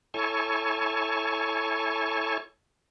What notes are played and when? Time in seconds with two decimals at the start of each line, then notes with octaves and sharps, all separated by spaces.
0.14 E4 A4 C#5 G#5 A5 C#6